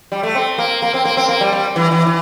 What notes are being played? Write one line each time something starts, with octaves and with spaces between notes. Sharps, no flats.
G3
A3
C4
A#3
A#3
C4
A#3
C4
A#3
G3
G3
E3
E3
E3